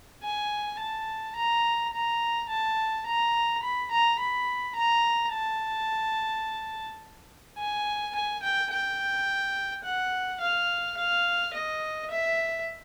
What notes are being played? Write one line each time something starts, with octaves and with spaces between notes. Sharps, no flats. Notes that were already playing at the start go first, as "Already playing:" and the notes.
G#5
A5
A#5
A#5
A5
A#5
B5
A#5
B5
A#5
A5
G#5
G#5
G5
G5
F#5
F5
F5
D#5
E5